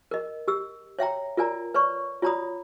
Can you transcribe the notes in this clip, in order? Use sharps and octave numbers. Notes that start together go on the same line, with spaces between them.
A#4 D#5
G4 E6
C#5 E5 G5 A#5
F4 A#4 D5 G#5 A#5
B4 C#5 D5 C#6
F4 C#5 D5 A#5 B5 D#6